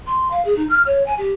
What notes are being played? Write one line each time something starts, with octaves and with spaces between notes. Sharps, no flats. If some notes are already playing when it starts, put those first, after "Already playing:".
C6
F5
G#4
D#4
F6
C#5
G#5
G4